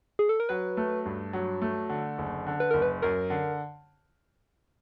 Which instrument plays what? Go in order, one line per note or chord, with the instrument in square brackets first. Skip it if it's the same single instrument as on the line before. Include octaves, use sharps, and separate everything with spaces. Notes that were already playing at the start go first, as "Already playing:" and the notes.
[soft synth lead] G#4
A4
A#4
[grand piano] F#3 [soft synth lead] B4
[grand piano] A3
G2
F#3
A3
D3
F#1
D3
[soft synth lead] B4
[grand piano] F#1 [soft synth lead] A#4
[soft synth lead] B4
[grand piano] F#2 [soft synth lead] A#4
[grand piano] D3